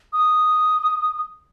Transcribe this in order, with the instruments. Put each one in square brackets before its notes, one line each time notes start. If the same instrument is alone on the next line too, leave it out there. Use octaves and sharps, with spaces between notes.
[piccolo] D#6